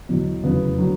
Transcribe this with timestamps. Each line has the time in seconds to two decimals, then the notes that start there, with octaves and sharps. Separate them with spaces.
0.09 E2 B2 F#3
0.43 F1 E2 C#3 F#3 B3
0.78 D3 F#3